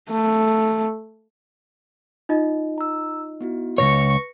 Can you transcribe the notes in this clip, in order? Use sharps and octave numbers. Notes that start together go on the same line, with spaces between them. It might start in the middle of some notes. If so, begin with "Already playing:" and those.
A3
D#4 F4 D#5
A#5 E6
B3 E4 F#4
C#2 B2 B4 C#5 C#6 A#6 C#7